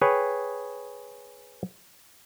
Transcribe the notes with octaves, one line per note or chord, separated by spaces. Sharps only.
G#4 B4 C#5 G5